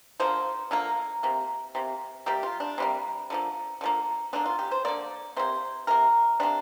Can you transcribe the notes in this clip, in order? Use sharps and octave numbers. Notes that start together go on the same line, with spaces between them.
D3 F3 A#3 C5
D3 F3 A#3 A#4
C3 A#3
C3 A#3
C3 G3 A#3 G4
F4
D4
C3 G3 A#3
D3 F3 A#3
D3 F3 A#3
D3 A#3 D4
F4
G4
C5
D3 A#3 D5
C3 A#3 C5
C3 A#3 A#4
C3 A#3 D4